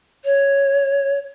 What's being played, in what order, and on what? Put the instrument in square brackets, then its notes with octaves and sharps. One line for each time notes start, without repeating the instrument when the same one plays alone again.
[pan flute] C#5